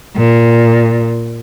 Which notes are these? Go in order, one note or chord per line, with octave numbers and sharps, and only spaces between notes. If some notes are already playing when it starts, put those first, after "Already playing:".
A#2